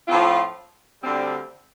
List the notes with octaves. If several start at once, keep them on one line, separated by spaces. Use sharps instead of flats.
A2 F3 A3 C4 F4
D2 D3 G3 C4